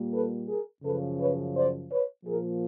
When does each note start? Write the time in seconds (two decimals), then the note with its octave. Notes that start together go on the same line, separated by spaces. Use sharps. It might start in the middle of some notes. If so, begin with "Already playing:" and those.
Already playing: A#2 G3 A#3
0.12 A4 B4
0.46 G#4 A#4
0.82 F#2 C#3 F3 A4 B4
1.18 B4 C#5
1.54 C5 D5
1.89 B4 C#5
2.25 A#2 F3 A#3 G#4 A#4